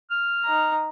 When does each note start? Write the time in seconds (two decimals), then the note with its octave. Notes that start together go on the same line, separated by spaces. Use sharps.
0.11 F6
0.44 D#4 A#5